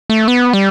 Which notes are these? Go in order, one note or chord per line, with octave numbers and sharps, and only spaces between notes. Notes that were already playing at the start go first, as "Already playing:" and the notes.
A3
B3
G3